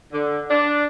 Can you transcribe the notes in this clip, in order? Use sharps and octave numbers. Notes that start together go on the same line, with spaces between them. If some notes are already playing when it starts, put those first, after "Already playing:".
D3
D4